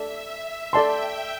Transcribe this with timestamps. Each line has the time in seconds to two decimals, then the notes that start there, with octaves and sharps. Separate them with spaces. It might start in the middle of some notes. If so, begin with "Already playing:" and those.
Already playing: A4 D5 E5 A5
0.29 E5
0.73 A4 D5 G5 A5 C6
1.03 G5